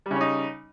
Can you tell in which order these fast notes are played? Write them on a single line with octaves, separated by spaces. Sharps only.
G3 C#3 C#4 D#4